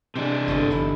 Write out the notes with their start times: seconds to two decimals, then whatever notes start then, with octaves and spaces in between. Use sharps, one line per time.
0.16 C3 E3 G#3 D4
0.48 G1 E2 D3 A3
0.70 G1 D#4 E4